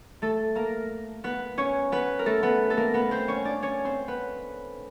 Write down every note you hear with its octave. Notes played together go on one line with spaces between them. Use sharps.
A3 A4
A#3 A#4
B3 B4
C#4 C#5
B3 B4
A#4
A3 A4
B3 B4
A4
A#3 A#4
B3 B4
C4 C5
C#4 C#5
D4 D5
C#4 C#5
C4 C5
B3 B4